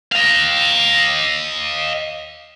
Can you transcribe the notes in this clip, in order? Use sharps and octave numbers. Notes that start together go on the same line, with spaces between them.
D#5 F5